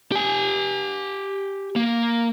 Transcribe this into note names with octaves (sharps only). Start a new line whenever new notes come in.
G4 G#5
A#3